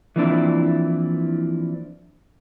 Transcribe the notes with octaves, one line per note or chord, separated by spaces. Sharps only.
E3 F3 A#3 C4 D4 E4